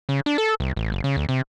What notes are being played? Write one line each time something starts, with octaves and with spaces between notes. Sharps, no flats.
C#3
D4
A4
C2
A1
F#1
C#3
D2
C3